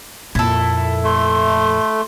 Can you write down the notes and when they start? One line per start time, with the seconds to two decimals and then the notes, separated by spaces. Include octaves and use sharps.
0.35 F2 A#2 E4 A4
1.04 A3 C6